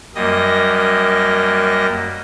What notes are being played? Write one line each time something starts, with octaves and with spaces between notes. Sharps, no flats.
F#2 G3 A#3 D#5 A#6